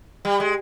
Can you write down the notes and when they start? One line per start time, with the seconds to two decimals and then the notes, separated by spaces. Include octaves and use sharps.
0.25 G3
0.40 G#3